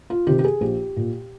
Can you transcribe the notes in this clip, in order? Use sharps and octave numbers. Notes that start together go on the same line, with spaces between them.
F4
C3 D#3 G4
G4
G#4
A#1 G4
A#2